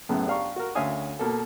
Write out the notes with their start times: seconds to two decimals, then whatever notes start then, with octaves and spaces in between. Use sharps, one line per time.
0.09 F#2 A2 C#3 B3
0.27 D4 G4 F5 A#5 C#6
0.56 F#4 A#4
0.75 D2 C#4 E5 F5 G#5 D#6
1.19 B2 A#3 A4